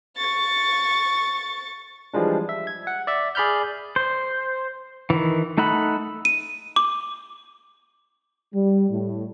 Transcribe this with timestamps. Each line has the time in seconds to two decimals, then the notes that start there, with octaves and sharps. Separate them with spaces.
0.17 C#6 A6
2.14 E3 F3 G3 G#3 D4
2.49 E5
2.67 G#6
2.87 F#5
3.07 D5 E5
3.35 G#4 D5 B5 F6 G6
3.96 C5
5.10 D#3 E3
5.58 A3 D#4 E5 F#5 B5
6.25 D#7
6.76 D6
8.54 G3
8.90 A2